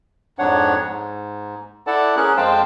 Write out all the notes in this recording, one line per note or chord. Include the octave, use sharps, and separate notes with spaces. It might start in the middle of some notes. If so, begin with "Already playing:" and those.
F2 G#2 D4 C#5 F#5
G#2
E4 A4 D5 F#5 A5
C#4 G#4 A#4 F#6
F2 G#3 C5 F5 G5 A5